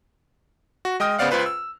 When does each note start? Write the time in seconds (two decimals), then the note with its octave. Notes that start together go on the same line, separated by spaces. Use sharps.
0.85 F#4
1.00 G#3 D#5 G5 D#6 F6
1.18 C#3 B3 C5 D5 F5 F#5
1.31 C#2 F4 B4 C5
1.46 E6